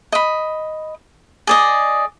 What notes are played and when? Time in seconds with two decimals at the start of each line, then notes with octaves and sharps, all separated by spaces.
0.12 D#5 B5
1.47 G#4 D5 D#5